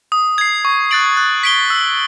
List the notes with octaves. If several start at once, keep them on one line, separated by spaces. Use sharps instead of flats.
D#6
G#6 C7
C#6
F#6 A6 D7 F#7
F#6
B6 D7 G7
E6